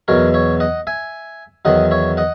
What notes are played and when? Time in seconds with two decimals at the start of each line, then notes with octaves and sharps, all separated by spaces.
0.08 E2 B2 F#3 A#4 C#5
0.34 C#5 E5
0.60 D#5 F#5
0.87 E5 G#5
1.65 E2 D#3 F#3 D#5 F#5
1.91 C#5 E5
2.17 D#5 F#5